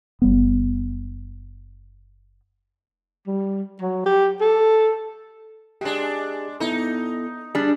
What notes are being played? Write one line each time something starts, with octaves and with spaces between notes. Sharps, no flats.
F#1 G3 B3
G3
F#3
G4
A4
G#3 D4 G4 G#4
B3 D#4 E4 A4
G3 D4 G#4